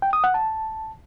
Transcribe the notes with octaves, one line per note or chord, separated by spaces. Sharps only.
G5
D#6
F#5
A5